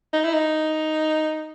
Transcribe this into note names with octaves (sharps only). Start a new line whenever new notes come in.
D#4
E4
D#4